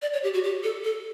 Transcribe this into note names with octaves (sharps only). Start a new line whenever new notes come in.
D5
C#5
G4
F#4
G4
A4
A4